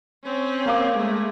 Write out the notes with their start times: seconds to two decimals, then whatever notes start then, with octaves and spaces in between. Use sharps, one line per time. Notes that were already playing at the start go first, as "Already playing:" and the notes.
0.23 C4 C#4
0.66 A#3 F5 D6
0.97 G#3 A3